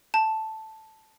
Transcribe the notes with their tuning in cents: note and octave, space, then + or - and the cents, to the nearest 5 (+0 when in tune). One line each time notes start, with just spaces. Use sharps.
A5 +0